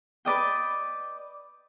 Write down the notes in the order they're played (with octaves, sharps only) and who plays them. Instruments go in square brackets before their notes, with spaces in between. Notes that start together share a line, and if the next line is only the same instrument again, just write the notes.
[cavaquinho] B4 D5 D#5 G5